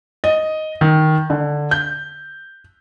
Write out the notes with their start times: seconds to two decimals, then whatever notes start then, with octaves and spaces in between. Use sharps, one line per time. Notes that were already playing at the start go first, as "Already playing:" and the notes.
0.24 D#5
0.81 D#3
1.30 D3
1.71 G6